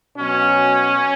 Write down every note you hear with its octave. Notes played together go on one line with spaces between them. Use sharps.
B2 F#3 C#4